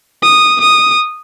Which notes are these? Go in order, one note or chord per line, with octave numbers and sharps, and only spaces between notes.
D#6
D#6